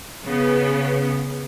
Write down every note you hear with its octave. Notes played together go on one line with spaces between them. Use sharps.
C#3 B3